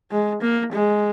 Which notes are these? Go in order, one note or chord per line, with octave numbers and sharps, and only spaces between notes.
G#3
A#3
G#3